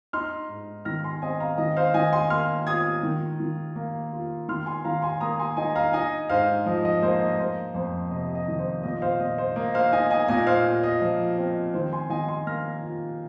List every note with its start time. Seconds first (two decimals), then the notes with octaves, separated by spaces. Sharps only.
0.13 D#4 C6 F6
0.49 G#2
0.85 D#3 F6 A#6
1.04 G#5 C6
1.22 C4 D#5 G#5
1.40 F5 A#5
1.58 D#3 D#5
1.77 C5 F5
1.94 D#3 D#5 G#5
2.12 G#5 C6
2.30 A#3 C6 F6
2.67 F4 D#6 G#6
3.03 D#3
3.40 D#3
3.76 A#3
4.13 F4
4.49 D#3 C6 F6
4.66 G#5 C6
4.84 D#3 F5 A#5
5.02 G#5 C6
5.20 A#3 A#5 D#6
5.40 G#5 C6
5.57 D#4 D#5 G#5
5.75 F5 A#5
5.93 D#4 D#5 G#5
6.30 G#2 C5 F5
6.66 F3 D#5
6.85 D#5
7.02 A#3 C5
7.21 D#5
7.38 A#3 C5
7.74 F2 C5
8.11 C3 D#5
8.35 D#5
8.48 D#3
8.59 C5
8.83 A#2 D#5
9.02 C5 F5
9.20 A#2 D#5
9.38 C5
9.56 A#3 D#5
9.74 C5 F5
9.93 D#4 D#5 G#5
10.11 D#5 G#5
10.28 A#2 D#5 G#5
10.47 C5 F5
10.65 A#2
10.83 D#5
11.01 F3
11.37 C4 D#5
11.74 D#3 C5
11.93 G#5 C6
12.10 D#3 D#5 G#5
12.28 G#5 C6
12.46 A#3 F6 A#6
12.83 F4